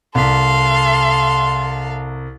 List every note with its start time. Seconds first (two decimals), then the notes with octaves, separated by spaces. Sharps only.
0.15 C2 A4 F5 C6 B6